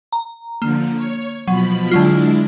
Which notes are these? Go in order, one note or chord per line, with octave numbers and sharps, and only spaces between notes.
A#5
D3 F3 A#3
C#5
B2 F3 F#3 B5
D3 F#3 G#3 D4 E4 F4